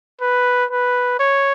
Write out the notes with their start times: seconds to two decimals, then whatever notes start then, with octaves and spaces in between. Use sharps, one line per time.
0.21 B4
0.71 B4
1.20 C#5